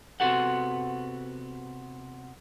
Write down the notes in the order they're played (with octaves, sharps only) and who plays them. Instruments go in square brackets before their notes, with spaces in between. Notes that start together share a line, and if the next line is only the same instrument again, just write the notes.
[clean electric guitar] C3 B3 F#4 A4 F#5